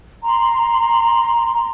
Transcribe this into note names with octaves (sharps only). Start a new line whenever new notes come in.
A#5 C6